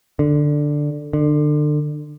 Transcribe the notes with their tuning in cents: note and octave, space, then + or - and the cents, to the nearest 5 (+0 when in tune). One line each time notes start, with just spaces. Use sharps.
D3 +5
D3 +30